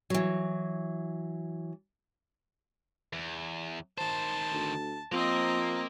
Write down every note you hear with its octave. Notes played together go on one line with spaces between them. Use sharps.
E3 F#3
E2
D#3 C5 A5
D2
F3 A#3 C4 D#5 A#5